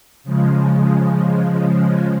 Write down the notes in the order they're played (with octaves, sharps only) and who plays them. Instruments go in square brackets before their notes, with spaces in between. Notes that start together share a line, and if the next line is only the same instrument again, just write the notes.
[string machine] C#3 F3 G#3